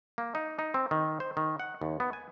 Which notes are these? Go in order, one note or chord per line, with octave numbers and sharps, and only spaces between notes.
A#3
D#4
D#4
C4
D#3
C5
D#3
F#5
D#2
B3
G#5